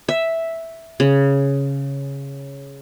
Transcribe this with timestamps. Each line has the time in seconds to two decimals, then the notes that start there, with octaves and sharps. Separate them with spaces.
0.09 E5
1.00 C#3